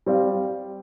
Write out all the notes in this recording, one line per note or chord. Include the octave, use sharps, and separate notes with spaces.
G3 C4 G4 D5 F5